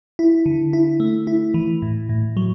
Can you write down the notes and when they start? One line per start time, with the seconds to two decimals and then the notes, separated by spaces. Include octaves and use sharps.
0.19 E4
0.46 D3
0.73 E4
1.00 A3
1.27 E4
1.54 E3
1.82 A2
2.09 A2
2.37 F#3